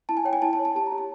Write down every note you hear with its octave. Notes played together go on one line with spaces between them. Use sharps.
E4 A5
G#5
C#5 G5
G#5
E4 A5
A5
C#5
A5
G4 A5
A#5
G4
A5